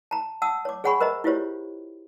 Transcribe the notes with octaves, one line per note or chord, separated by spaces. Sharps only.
A5 A#5
F#5 A5 D#6 E6
C#5 D6
G#4 C#5 F#5 G#5 B5 C#6
A#4 C5 D#5 E5 A#5
E4 F4 G4 C5 C#5